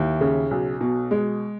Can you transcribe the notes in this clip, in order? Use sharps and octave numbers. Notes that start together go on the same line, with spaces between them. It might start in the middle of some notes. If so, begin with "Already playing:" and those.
Already playing: D#2 E4
C#3
B1
B2
G#3